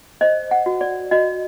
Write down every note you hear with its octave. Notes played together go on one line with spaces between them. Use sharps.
C5 D#5
F#5
F#4
D5
F#4 D#5